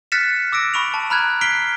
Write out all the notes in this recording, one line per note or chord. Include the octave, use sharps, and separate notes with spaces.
F6 F#6 A6 B6 C#7 E7
D6 E6 A#6 D7
B5 C#6 D7 F7
A5
A#5 B5 F6 F#6 G#6
F6 B6 C7 D7 G7